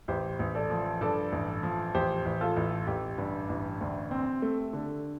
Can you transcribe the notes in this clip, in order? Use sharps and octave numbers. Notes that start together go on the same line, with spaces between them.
A1 G4 C5
A1
A4 D5
F3
G2 A4 D5
A1
F3
A1 G4 C5
A1
F4 A4
A1
A1 G4
G2
A1
D2
C4
A3
D3